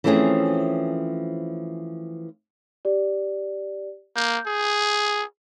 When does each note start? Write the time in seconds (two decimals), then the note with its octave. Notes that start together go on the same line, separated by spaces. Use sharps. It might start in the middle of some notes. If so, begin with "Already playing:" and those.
0.04 E3 F3 A3 C4 C#4 G#4
2.85 G4 D5
4.16 A#3 G6
4.46 G#4